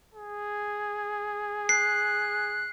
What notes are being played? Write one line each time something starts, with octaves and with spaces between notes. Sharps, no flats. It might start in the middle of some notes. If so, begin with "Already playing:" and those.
G#4
F#6 C7